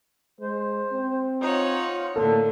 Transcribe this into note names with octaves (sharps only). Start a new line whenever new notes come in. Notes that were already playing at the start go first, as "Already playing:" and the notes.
G#3 C5
C4
D#4 F4 C#5 F#5
A2 D3 A#3 A4